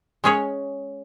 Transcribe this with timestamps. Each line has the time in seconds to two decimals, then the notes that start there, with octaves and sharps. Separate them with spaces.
0.24 G#3 C#4 G#4 C#5